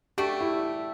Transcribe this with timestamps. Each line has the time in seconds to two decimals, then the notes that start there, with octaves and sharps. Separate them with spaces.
0.18 A3 D4 F#4 G4
0.41 E4